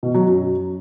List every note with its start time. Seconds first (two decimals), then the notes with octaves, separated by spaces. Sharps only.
0.03 B2
0.14 F#3
0.26 F#2